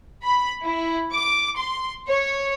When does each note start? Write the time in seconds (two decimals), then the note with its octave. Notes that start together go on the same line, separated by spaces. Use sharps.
0.23 B5
0.63 E4
1.12 D6
1.58 C6
2.07 C#5